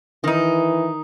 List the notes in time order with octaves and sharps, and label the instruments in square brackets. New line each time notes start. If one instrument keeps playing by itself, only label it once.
[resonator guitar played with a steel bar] D#3 D#4 [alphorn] E3